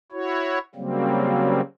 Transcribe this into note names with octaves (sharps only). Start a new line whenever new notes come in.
E4 F#4 C#5
C#3 F#3 G3 A#3 C4